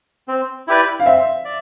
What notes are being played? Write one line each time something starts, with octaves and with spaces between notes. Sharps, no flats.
C4
E4 G4 B4 D5
F5
C4 E5
D5